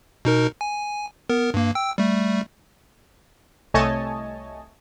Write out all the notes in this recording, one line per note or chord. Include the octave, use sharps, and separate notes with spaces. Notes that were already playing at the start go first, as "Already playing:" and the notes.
B2 D#4 A#4
G#5
B3 A#4
G2 A#3
G5 E6
G3 A3
C2 A3 C#5 D#5 G#5 A5